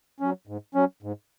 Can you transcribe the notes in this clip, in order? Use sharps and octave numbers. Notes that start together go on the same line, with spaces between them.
F#3 C#4
G#2
F#3 C#4
G#2